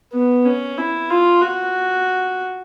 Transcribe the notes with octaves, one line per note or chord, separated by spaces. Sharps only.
B3
C#4
E4
F4
F#4